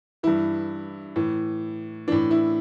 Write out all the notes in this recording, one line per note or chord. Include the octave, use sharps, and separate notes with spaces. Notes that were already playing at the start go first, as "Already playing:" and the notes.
G2 E3 E4
A2 E3
A2 E3 D4
E4